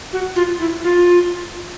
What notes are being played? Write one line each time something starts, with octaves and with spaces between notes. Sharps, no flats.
F#4
F4
E4
F4